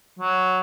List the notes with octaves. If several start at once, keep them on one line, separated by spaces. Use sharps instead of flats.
F#3